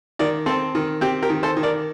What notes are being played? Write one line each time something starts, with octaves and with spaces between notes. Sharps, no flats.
D#3 A#4 D5
C4 A4 C5
D#3
C4 G4
G4 A#4
D#3
A4 C5
D#3
A#4 D5